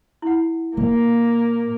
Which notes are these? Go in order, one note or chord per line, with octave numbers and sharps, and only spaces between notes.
E4 F#5
A#2 A#3